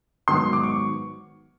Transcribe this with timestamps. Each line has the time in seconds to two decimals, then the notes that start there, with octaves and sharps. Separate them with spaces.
0.28 G#2 D#3 F#3 B3 C6
0.53 D6
0.63 C#6